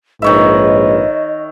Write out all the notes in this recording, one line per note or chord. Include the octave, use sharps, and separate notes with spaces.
A#1 G#2 D#3 B4 C#5 D#5 E5